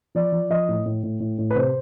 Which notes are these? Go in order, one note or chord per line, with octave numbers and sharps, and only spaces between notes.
F3 D5
F3
F3 D#5
A2
A2
A2
A2
A2
B4
C3 C5